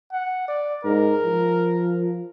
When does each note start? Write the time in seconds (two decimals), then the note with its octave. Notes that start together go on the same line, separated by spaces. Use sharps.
0.12 F#5
0.48 D5
0.85 G#2 A#4
1.24 F3